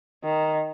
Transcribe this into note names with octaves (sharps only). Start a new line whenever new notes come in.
D#3